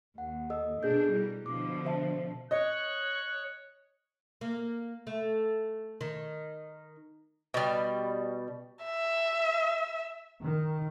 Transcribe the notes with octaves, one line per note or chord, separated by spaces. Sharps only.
D#2 F#5
A4 D#5 E6
B2 D4 G#4 A4 G6
G3 E4
B2 D3 F3 D6
C5 E5 A5
C#5 D#5 F#6
A#3
A3
D#3
B2 G3
E5
D#3